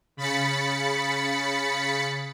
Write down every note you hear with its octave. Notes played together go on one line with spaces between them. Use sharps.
C#3 B5 A6 B6 C#7